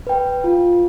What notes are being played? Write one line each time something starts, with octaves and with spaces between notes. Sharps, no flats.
B4 G5
F4